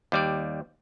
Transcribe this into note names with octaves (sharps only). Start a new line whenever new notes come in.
D#2 G3 D5